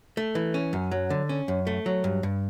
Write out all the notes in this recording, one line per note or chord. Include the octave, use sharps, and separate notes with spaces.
A3
E3
C#4
F#2
F#3
D3
C#4
F#2
A3
F#3
G2
G2